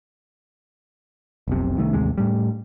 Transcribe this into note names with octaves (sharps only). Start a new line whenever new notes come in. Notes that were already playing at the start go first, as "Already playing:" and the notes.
F1 B1 C3
C2 D#3 A3
A1 D#2 C3 G#3
A2 G3